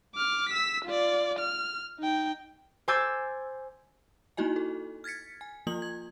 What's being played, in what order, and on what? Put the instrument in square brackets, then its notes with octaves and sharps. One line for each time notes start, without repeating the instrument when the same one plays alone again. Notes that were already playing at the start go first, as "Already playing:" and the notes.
[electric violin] D6 F6
E6 B6
F4 D5
F6
D#4 G5
[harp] C5 G#5 D6 E6 G6 A6
[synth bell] A#3 D#4 E4 F#4 D#5 G#5
A4
F6 G#6 A6 B6 C#7
G#5
F3 A#3 F4 D#6 F#7
G#6